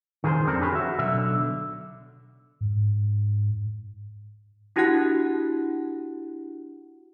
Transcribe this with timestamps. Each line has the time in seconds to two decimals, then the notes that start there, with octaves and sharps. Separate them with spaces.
0.24 D#3 G#4 A#4 C5
0.47 F2 D3 C4 D4 A4 A#4
0.61 G4 G#4 B4 C#5
0.73 F#4 E5
0.98 B1 D3 E5
2.61 G#2
4.76 D4 E4 F#4 G4 F#5 F#6